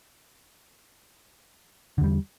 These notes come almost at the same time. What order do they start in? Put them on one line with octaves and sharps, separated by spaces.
D3 E2 G3